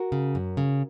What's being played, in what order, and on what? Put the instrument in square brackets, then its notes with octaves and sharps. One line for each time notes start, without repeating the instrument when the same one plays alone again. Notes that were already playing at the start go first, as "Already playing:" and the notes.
Already playing: [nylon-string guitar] F#4 A#4
C#3
F#2
C#3